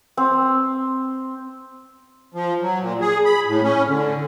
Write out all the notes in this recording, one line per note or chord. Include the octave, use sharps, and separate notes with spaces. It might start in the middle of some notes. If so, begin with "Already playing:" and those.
C4
F3
F#3
A#2
G#4
B5
A2
C#4
D3